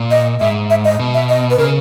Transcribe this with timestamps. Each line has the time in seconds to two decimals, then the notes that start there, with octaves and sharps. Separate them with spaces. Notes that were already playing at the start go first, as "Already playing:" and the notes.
Already playing: A#2
0.11 D#5
0.40 G#2 E5
0.70 E5
0.85 D#5
0.99 B2
1.14 E5
1.29 D#5
1.50 B4
1.58 C#3 A#4